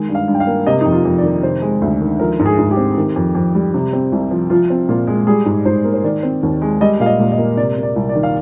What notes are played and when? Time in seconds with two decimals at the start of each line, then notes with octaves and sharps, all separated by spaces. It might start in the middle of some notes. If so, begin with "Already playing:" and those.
Already playing: D#3 G#3
0.09 G2
0.15 F5
0.28 G2
0.35 G5
0.40 F5
0.47 A#3
0.67 C3 D#5
0.81 F2 D#4
0.92 F4
1.05 F2
1.18 D5
1.23 D#3
1.43 C3 C5
1.62 G#3
1.82 D2
2.01 D#3
2.19 F3 A#4
2.40 G#2
2.46 G#4
2.59 G#2
2.71 G4
2.77 C4
2.97 D#3
3.16 F2
3.35 F2
3.55 G3
3.74 C3
3.93 C4
4.12 C2
4.31 F3
4.50 F3 F4
4.70 C4
4.89 A#2 F4
5.07 G#3
5.27 G3 G#4
5.46 G#2
5.65 G#2 C5
5.85 A#3
5.94 C5
6.04 D#3 D5
6.23 C4
6.43 D#2
6.62 G#3
6.81 G3 D#5
7.00 A#2 F5
7.06 D#5
7.19 A#2
7.32 D#5
7.38 A#3
7.57 C3 D5
7.77 A#3
7.83 D5
7.96 C2
8.09 D5
8.15 D#3
8.23 F5